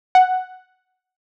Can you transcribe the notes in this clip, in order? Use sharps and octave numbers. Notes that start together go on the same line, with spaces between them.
F#5